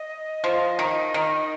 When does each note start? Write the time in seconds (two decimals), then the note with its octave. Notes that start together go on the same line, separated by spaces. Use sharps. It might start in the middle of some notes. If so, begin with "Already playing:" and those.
Already playing: D#5
0.44 F3
0.79 D#3
1.14 D#3